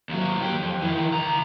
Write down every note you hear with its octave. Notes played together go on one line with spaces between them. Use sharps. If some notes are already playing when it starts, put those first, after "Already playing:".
D#2 F#3
D#3 G4
F2
D#3 E3
C#2 A#5